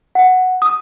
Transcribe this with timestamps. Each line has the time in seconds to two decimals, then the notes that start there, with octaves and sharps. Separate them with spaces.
0.15 F#5
0.62 D#6